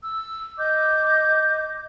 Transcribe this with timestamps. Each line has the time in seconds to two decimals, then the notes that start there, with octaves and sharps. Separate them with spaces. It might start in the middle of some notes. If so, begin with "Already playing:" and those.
0.03 E6
0.57 D#5 D6 G6